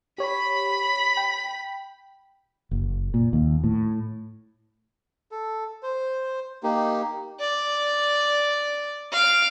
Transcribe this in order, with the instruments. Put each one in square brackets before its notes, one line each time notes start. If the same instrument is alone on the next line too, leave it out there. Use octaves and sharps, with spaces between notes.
[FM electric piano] G4 C#5 [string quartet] B5
[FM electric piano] G5
[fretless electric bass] F#1
A#2
D#2
A2
[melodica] A4
C5
A#3 D#4 G4
[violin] D5
F5 D7